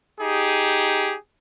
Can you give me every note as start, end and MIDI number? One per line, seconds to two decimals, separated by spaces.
0.20 1.15 63
0.20 1.15 67
0.20 1.15 68